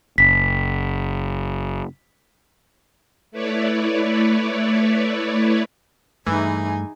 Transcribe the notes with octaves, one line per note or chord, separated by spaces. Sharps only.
F#1 B6
A3 E4 B4 C#5 D5
G2 E3 A3 D#4 G#4 G#5